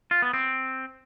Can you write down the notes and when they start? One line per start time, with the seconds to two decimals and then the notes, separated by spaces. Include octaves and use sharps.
0.11 F4
0.22 B3
0.34 C4